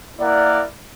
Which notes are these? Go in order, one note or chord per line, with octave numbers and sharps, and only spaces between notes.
A#3 E4 A#4 D5 F#5